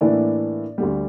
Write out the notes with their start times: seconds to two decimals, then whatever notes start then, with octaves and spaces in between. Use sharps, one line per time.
0.01 A2 E3 A#3 D4 D5
0.78 D2 D3 G3